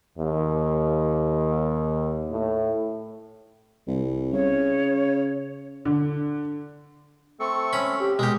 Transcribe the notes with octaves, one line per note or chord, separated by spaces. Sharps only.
D#2
A2
C2
C#3 C#5
D3
A3 C4 A4 C#6
C#4 B5
G4
B2 G#3 G4 A#4